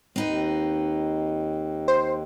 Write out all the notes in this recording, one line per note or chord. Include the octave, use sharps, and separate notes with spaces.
D#2 C4 D#4 B4
C5